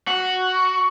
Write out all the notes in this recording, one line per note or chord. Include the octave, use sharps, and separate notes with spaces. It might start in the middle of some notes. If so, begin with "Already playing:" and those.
F#4